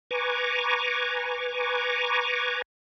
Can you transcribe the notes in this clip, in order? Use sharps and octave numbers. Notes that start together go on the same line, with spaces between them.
B4 G#5 A#5 C#6 D6